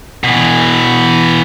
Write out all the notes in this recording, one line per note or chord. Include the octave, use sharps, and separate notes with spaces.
B2 E3